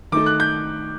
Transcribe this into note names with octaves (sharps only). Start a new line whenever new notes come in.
D#3 A3 D#4 A4 D6
F#6
G6